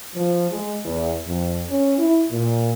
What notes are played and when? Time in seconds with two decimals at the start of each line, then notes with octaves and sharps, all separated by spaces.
0.16 F3
0.51 G#3
0.85 E2
1.26 F2
1.69 C#4
1.99 E4
2.31 A#2